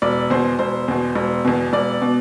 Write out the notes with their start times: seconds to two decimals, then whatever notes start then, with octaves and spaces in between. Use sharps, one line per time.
0.02 E1 D5
0.30 E2 B2 C5
0.59 E1 C5
0.88 E2 B2
1.15 E1
1.45 E2 B2
1.73 E1 D5
2.02 B2